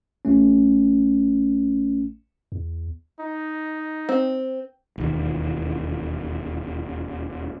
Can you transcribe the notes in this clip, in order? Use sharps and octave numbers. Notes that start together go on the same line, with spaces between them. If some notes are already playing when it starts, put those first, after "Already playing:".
A1 A3 C#4
E2
D#4
C4
E1 D#2